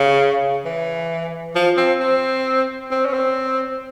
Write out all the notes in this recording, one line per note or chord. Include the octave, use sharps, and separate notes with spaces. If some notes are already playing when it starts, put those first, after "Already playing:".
Already playing: C#3
E3
F3
C4
C4
C4
C#4
C4